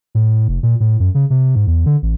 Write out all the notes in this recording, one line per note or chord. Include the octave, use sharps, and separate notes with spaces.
A2
F1
A#2
A2
F#2
C#3
C3
G#2
E2
D3
A1